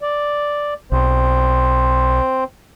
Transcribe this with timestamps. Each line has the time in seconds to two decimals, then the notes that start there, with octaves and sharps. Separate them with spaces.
0.02 D5
0.92 B1 C4 C5